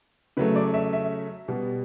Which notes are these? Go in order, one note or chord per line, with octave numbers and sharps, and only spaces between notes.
C#3 F#3 A3 B4
D5
E5
E5
B2 G3 B3